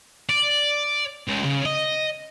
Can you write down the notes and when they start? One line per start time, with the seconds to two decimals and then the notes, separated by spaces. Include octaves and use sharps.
0.29 D5
1.27 C#2
1.45 C#3
1.66 D#5